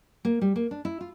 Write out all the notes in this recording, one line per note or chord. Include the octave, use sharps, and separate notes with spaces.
A#3
G3
A#3
D4
E4
F4